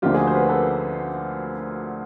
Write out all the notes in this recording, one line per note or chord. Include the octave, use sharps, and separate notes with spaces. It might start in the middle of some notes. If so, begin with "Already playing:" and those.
D2 D3 F3 A#3 F4 G4
F#4 G#4
C5
B4
A#4
A4 B4